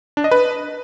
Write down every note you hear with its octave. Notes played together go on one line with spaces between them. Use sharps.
D4
D#5
B4